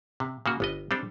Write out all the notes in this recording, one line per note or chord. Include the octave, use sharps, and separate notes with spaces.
C3
C#3 A#3 F#4
G1 B3 D#5
G3 C4 D4 A4